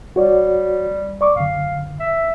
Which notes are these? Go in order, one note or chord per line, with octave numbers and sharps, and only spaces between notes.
G3 F#4 C#5 D5
D5 C#6 D6
F#2 D3 F5
E5